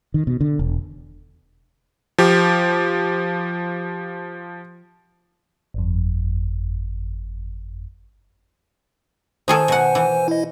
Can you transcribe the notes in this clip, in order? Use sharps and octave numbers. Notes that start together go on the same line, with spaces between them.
D#3
B2
D3
E1
F3 G4
G1 F2
D#3 G#4 A4 C5 G#5
B2 F#5
E3
E4 D#5